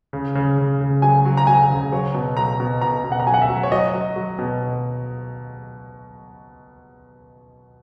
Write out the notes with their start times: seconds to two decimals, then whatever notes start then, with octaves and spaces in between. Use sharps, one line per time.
0.13 C#3
0.35 C#3
0.58 C#3
0.81 C#3
1.02 F#3 G#5
1.25 F#3
1.37 A#5
1.47 F#3 G#5
1.70 C#3
1.92 F#3 C#5
2.14 B2
2.37 F#3 A#5
2.60 B2
2.82 B2 A#5
3.04 B2
3.12 F#5
3.20 A#5
3.27 F#3 G#5
3.34 F#5
3.42 E5
3.49 F#3
3.63 C#5
3.71 F#3 D#5
3.94 F#3
4.16 F#3
4.39 B2